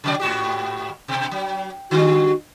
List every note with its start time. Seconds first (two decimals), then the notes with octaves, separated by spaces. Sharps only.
0.04 C3 F#3 D5
0.20 G#2 F#4 G4
1.08 B2
1.31 F#3
1.91 D3 G3 F#4